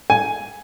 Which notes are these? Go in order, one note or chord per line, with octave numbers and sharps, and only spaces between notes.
G#5